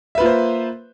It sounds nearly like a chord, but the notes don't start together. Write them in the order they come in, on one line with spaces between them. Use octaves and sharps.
E5 B4 F4 A#3 C5